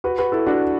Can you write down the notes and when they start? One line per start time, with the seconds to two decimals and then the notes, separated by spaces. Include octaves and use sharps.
0.04 F#4 B4
0.19 F#4 B4
0.32 E4 A4
0.46 D4 F#4